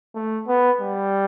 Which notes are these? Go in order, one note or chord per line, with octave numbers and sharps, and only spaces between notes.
A3
B3
G3